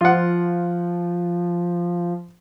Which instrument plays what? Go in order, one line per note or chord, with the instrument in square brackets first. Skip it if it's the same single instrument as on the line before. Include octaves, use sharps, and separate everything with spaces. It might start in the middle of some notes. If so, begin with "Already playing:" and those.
[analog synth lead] F3 [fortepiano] F4 F#5